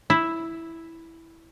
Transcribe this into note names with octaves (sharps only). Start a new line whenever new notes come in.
E4